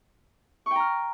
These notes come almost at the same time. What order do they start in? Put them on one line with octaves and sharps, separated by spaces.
C#6 G5 A#5 F6